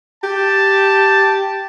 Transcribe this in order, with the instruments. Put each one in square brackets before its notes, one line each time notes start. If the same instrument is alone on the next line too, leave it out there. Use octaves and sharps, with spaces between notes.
[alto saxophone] G4 [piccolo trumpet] A5